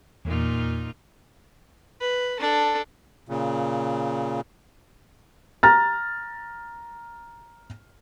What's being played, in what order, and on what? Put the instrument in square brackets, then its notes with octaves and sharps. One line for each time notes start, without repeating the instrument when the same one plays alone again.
[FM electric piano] E2 [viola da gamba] A#2 D#4 F4
[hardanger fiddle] B4
D4 A4
[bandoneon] A#2 C#3
[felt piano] A#5 F6 A6